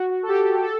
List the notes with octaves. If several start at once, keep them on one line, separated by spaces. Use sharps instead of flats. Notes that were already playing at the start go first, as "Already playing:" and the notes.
Already playing: F#4
F#4
A4
G4
A4